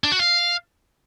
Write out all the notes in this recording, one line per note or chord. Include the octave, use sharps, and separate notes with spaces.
D4
F#4
F5